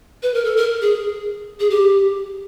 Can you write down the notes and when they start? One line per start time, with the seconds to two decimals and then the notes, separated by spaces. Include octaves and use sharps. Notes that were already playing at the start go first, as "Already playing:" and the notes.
0.23 B4
0.34 A#4
0.45 A4
0.56 A#4
0.82 G#4
1.60 G#4
1.70 G4